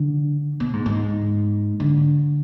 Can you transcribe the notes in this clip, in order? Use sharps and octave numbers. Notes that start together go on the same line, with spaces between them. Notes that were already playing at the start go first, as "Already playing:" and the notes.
Already playing: D3
B2
G#2
G#2
D3